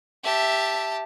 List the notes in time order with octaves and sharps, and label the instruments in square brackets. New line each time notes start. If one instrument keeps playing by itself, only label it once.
[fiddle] G4 A5 [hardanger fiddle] E5